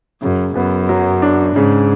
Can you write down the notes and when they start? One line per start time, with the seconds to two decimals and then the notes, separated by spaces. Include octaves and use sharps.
0.22 F#2 C#3
0.55 F#2 B3
0.89 F#3
1.22 D4
1.56 G#2 C#3